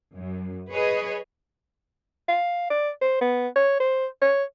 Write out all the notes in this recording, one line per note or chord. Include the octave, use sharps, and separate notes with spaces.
F#2
G#4 B4 C#5 D#5
F5
D5
C5
B3
C#5
C5
C#5